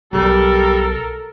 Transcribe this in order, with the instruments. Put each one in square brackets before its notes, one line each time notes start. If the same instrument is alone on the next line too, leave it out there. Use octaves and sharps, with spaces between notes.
[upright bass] B1 [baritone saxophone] G3 [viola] A4 A#4